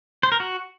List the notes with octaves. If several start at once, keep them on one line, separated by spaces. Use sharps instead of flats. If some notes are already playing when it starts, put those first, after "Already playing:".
C5
A#4
F#4